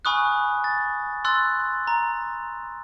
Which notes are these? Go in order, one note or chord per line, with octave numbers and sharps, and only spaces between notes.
G#5 B5 C#6 D#6 F6 F#6
A6
C6 E6 F#6 A6
A#5